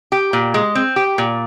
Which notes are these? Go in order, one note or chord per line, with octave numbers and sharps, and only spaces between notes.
G4
A#2
G#3
C4
G4
A#2